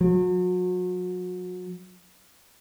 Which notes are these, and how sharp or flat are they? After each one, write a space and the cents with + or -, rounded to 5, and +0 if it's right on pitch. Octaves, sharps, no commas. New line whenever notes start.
F#3 -35